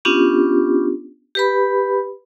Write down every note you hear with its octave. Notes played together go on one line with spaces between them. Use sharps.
B3 C#4 D4 F4 G4
G4 B4 B5